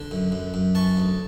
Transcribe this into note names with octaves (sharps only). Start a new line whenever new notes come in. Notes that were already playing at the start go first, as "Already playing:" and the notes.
Already playing: D3
F#2
F#2
F#2
E3 A5 C#6
D2